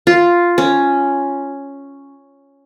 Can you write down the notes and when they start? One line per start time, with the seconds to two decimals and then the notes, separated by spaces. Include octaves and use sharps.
0.07 F4
0.58 C#4